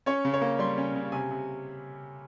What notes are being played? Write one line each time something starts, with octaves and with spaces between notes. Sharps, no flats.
C#4 C#5
C#3
C#5
A#3
G3 C6
C#4
C#3
C3 G#5
C3